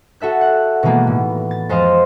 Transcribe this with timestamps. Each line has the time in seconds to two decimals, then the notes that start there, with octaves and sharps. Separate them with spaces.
0.20 F#4 A4 E5 F#6
0.41 F#5
0.83 B2 D#3 E3 G#3 A#3 B3
1.07 A2
1.51 A6
1.69 F2 G#3 C5 D#5 F5 C6